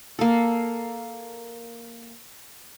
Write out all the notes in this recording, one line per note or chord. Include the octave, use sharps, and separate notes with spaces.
A#3 A4